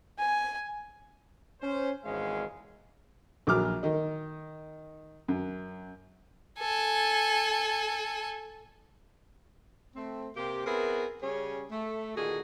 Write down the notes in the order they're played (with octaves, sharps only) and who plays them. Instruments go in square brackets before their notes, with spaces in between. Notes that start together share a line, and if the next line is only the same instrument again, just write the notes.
[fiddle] G#5
[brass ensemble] C#4 C5
G#1 E2 G#3 C#4 F5
[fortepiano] A#1 F#3 D6 F6
D#3 D#4
F#2
[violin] A4 G#5
[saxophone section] A3 C4
C3 A#3 G4
B3 C4 E4 G#4 A#4
C#3 G3 C#4 G#4 C#5
A3
A#2 D3 D#3 F#4 G#4